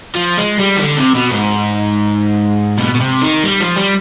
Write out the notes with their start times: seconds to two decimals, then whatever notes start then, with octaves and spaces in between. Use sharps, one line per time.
0.15 F3
0.37 G#3
0.59 G3
0.77 D#3
0.81 D3
0.97 C3
1.15 B2
1.31 G#2
2.78 B2
2.94 B2
3.00 C3
3.22 D#3
3.44 G3
3.61 F3
3.76 G3